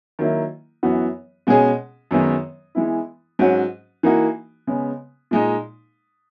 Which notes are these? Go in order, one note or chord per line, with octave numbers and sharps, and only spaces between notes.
D#3 F#3 A#3 E4
F#2 E3 B3 F#4
B2 G#3 C#4 G#4
F#2 D#3 G#3 B3
E3 G#3 B3 E4
G#2 F#3 C#4 F#4
E3 A#3 D#4 F#4
C#3 G#3 B3
A#2 G#3 D#4